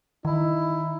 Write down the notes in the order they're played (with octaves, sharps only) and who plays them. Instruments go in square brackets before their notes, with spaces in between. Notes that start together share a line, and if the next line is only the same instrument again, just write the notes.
[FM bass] D#3 [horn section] D#4 E4